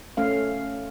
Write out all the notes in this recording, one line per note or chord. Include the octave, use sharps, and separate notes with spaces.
A3 C#4 F5